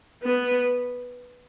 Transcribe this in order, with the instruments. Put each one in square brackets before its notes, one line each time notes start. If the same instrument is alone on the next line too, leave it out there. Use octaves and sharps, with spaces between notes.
[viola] B3